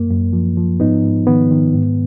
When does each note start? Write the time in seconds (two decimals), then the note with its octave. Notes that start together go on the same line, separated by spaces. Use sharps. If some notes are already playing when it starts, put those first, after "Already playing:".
Already playing: F#2 A#3
0.10 F#2
0.33 F3
0.57 F3
0.80 G#2 B3 D#4
1.04 G#2
1.27 D#3 B3
1.51 D#3
1.75 G#2